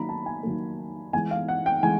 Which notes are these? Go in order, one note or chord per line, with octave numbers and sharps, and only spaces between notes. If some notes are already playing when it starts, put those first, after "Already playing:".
Already playing: D#3 F#3 A#3 A#5 B5
A5
G#5
D#3 F#3 A#3
E3 G#3 B3 G#5
F5
F#5
G5
E3 G#3 G#5